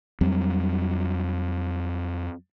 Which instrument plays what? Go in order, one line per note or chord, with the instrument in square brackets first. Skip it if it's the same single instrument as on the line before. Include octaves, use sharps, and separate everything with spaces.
[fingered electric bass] F2 F#3 G3 C4